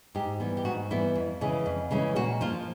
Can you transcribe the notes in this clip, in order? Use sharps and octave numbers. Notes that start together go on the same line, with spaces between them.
G#2 G4
E3 G3 B3
G4
G#2 F#4
E3 G3 B3 E4
F2
C#3 E3 G#3 C#4
F2
C#3 E3 G#3 C#4
A#2 F#4
F3 A#3 F4